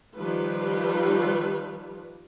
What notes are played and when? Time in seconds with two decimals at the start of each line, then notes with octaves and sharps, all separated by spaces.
0.16 D#3 F3 G3 B4